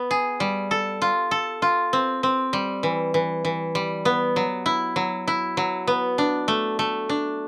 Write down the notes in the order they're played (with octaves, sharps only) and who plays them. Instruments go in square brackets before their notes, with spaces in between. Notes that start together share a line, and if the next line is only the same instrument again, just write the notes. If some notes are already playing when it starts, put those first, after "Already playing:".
Already playing: [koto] B3
G#4
G3
A4
F4
A4
F4
C4
C4
G3
E3
E3
E3
G3
B3
F#3
E4
F#3
E4
F#3
B3
D4
A3
A3
D4